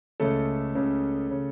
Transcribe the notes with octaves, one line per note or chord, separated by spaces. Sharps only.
C#2 C#3 A3 A4
C#2 C#3
C#3